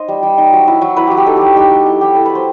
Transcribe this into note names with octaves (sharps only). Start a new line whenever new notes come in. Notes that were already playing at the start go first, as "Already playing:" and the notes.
Already playing: D#4 C5 D#5
G3
G3
D#4
F#3
E4
F#3
E4 B4
F#3 G4
G4
D#4 A4
F#3 G4
D#4 G4
F#3
E4 G4
F#3 G4
E4 A4
F#3 B4
C5